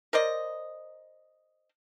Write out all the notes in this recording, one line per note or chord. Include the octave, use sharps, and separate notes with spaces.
A#4 C5 D5 D#5